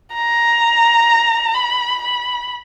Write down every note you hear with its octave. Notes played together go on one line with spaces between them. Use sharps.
A#5
B5
B5